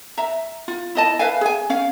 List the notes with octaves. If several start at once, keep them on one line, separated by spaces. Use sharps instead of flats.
E5 A#5
F4
E4 D#5 A5
B4 E5 F5 G#5
G#4 G#5
C#4 F5